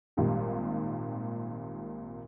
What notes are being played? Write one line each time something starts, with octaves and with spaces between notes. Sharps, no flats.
G#1 A#2 D#3 G3